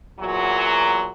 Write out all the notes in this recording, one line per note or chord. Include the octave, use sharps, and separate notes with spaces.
E2 A#2 F#3